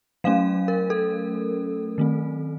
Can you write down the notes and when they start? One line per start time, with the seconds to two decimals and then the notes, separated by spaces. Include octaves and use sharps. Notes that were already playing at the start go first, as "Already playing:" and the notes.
0.24 F#3 A3 C#4 F5
0.68 A#4
0.90 A4
1.98 D#3 A3 C4